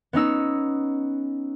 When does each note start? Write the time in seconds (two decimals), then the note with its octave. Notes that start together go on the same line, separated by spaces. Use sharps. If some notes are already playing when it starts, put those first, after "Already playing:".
0.13 B3 C#4 D#4 E6